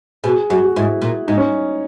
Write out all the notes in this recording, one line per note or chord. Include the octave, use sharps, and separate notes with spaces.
B2 G#4
F#2 F#4
F#4
G#2 E4
A#2
G#2 D#4
C#4